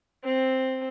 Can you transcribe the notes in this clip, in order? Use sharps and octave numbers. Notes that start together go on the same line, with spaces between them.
C4